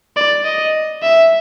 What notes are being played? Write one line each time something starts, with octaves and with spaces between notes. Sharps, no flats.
D5
D#5
E5